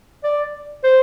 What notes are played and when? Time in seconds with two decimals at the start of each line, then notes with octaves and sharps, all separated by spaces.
0.24 D5
0.84 C5